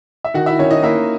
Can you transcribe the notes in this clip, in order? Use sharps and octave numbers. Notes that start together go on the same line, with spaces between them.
E5
D#3 F#4 F#5
E4 E5
D#3 C#4 C#5
D#4 D#5
A#3 E4 E5